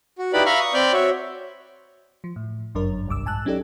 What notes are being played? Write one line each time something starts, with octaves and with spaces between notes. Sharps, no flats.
F#4
D#4 E4 G4 B4 D5 B5
E5 F5 A#5 B5 C#6 F6
C#6 D#6
C4 D5 B5 F6 G6
F#4 C#5 E5
F3
A2
G1 F#2 D4 A#4 C#5
G1 C2 G2 D6 E6
A#1 G#2 G#5 A5 E6 F#6
F#3 C#4 D#4 G4 A4 D5